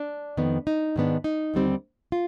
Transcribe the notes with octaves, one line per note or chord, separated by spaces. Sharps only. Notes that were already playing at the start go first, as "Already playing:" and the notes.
Already playing: D4
F2 D#3 B3
D#4
G#2 D#3 B3 D4
D#4
D#2 D3 G3 C4
F4